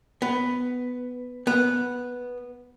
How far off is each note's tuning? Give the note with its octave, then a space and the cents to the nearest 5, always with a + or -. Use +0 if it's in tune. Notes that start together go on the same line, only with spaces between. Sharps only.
B3 +5
B3 -5